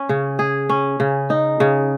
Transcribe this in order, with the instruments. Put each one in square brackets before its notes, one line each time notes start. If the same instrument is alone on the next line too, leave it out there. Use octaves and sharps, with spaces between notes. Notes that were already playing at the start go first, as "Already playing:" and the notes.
Already playing: [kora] C#4
C#3
G#4
C#4
C#3
D#4
C#3